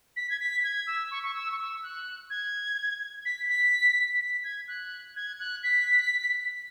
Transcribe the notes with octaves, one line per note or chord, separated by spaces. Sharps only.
B6
G#6
B6
G#6
E6
C#6
C#6
E6
C#6
E6
F#6
G#6
B6
B6
B6
G#6
F#6
G#6
F#6
B6